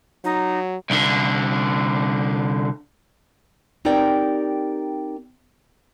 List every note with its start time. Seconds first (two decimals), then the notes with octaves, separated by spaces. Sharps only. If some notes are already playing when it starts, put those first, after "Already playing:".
0.24 F#3 D#4
0.90 C2 D3
3.85 C4 D#4 G4 A#4 D5 G5